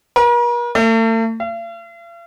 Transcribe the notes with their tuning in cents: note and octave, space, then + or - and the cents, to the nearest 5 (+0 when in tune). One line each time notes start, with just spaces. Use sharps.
A#4 +45
A3 +40
F5 -45